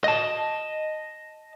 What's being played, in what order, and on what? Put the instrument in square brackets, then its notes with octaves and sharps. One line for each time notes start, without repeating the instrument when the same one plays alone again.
[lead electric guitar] D#5 A5